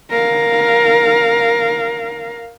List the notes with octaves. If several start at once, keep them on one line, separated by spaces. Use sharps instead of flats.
A#4 F5